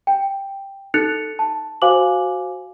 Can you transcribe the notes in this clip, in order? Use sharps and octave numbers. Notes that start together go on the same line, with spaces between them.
G5
D#4 A4 F#6 A6 C#7 F7
A5
F#4 C5 F5 G#5 D6 F#7